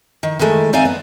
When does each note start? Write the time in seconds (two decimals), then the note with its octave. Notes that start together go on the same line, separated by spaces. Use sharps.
0.23 D#3
0.39 D#3 E3 G#3 A3
0.73 C4 D#4 D5 E5 F5 G#5
0.85 B3